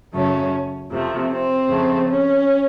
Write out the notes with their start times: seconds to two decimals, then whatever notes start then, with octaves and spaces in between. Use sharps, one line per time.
0.13 F#2 C#3 F#3 A3 C#4
0.91 F2 C3 F3 A3
1.31 C4
1.69 F2 C#3 A3
2.08 C#4